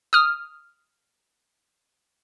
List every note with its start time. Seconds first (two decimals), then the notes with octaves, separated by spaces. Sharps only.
0.13 D#6 F6